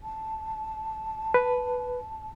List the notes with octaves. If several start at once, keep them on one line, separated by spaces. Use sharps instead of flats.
A5
B4